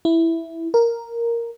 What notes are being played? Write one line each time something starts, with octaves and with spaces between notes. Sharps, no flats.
E4
A#4